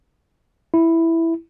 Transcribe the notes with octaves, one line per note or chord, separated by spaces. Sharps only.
E4